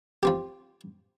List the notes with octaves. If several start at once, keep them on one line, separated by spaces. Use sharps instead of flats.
F3 C4 G4